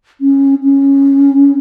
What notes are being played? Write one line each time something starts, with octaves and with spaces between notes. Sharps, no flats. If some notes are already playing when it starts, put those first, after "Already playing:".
C#4
C#4